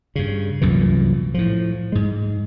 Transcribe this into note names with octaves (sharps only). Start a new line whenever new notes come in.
G2 C#3
C2 F#2 A#2 E3
A2 F3
G#2 G#3